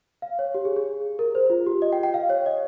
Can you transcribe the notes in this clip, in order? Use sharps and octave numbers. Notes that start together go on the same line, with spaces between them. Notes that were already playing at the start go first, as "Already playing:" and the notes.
F5
C#5
G4
G#4
G#4
A#4
C5
F4
G4
D#5
G5
G5
F5
C#5
D#5